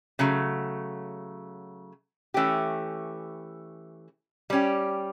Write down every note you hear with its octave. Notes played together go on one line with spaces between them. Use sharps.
C#3 F#3 A3
E3 A3 C#4 G4
G3 C#4 G4